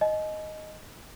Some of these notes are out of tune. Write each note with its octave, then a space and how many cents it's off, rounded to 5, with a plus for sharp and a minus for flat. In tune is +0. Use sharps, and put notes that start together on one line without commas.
D#5 +0 G#5 +45